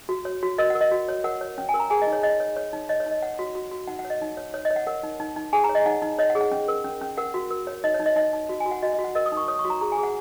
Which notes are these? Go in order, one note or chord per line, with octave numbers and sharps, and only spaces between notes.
F#4
C#5
F#4
A#4 D#5
F#5
A#4
D#5
F#4
C#5
A#4 F#5
C#5
C#4
G#5
A#4
A#5
G#4 G#5
D#5
D#4
C#5
C#5 D#5
C#5
C#5
D#4
C#5 D#5
C#5
D#4 D#5
C#5 F#5
F#4
F#4
F#4
D#4 F#5
F#5
C#5
D#5
D#4
C#5
C#5
D#5
C#5
F#5
A#4 F#5
D#4
D#4
D#4
G#4 G#5
A#5
C#5
D#5
D#4 F#5
D#4
C#5 D#5
F#5
G#4
F#5
C#4
A#4
C#4
C#4
A#4 F#5
F#4
A#4
C#5
D#4 D#5
C#5
D#4
D#5
D#4 D#5
D#4
F#4
G#5
F#4
F#5
F#4 D#5
D#5
F#4
F#5
A#4 D#5
D#6
D#4
C#6
C#5 D#6
C#6
F#4
A#5
G#4 A#5
G#5
G#4
F#5